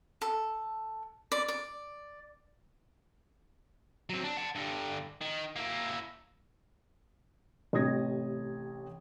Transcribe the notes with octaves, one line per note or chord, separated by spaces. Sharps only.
A4
D5
D5
F#3 C4
D4
F#5 A5
G2 D3
D#3
A#3 E4
A1 C3 A3 D#6 G#6 A#6